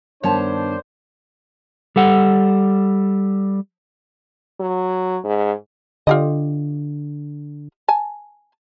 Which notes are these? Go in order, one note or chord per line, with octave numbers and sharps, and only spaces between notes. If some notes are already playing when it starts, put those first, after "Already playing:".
G2 D#3 B3 D4 C5 C#5 A5
G3 A4 F#5
F#3
G#2
D3 F4 G4 D#5
G#5 A5